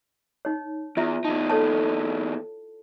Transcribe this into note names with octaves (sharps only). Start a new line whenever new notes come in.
D#4 C#5
E2 E4 F4 E5
E2 D#4 A5
A4 C#5 A5